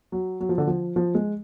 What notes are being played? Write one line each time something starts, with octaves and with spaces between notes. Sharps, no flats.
F#3
F#3
F3
D3
F3
F3
G#3